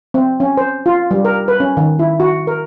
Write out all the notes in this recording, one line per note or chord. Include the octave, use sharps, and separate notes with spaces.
C4
C#4
C5
F4
G3
A#4
B4
C#4
D#3
E4
F#4
A#4